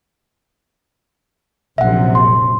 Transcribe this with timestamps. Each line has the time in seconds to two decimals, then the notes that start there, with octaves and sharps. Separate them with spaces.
1.78 A#1 F#2 C3 E5 F#5
2.15 C6